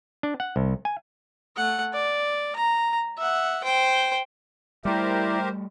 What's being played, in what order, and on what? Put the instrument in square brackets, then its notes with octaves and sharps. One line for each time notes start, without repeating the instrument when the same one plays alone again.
[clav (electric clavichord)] D4
F#5
C2
G#5
[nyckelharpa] A3 F#5
D5
A#5
E5 F#5
C5 G5
[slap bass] G3 A3 [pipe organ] E4 D5 [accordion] G4 A#4 C5